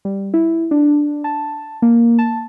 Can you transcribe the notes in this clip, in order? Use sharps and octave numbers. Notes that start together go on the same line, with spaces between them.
G3
E4
D4
A5
A#3
A5